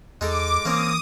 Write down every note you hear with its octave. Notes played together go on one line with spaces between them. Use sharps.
E2 G#3 D#4 A4 D6
E3 A#3 C4 C#4 D#6